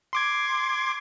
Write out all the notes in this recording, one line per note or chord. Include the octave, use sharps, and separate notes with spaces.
C6 D6 G#6